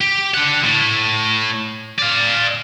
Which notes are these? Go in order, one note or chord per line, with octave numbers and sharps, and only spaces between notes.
G4
D4 F#5
A2
D5 F5